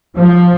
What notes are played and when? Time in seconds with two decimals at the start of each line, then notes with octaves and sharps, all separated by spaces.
0.17 F3